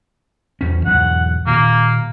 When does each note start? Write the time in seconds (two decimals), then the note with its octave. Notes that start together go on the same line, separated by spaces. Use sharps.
0.61 E2 C#4
0.85 B1 E2 G#2 F#5
1.47 A#2 D#3 A#3